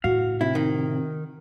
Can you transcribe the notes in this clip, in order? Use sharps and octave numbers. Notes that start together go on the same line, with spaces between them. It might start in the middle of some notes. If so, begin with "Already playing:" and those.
A2 C#3 F#4 F5
C3 E4
D#3